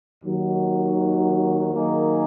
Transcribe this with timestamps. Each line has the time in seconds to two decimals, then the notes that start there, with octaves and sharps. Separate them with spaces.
0.23 D#2 D#3 F#3
1.73 D#3 F#3 A#3 D#4 G#4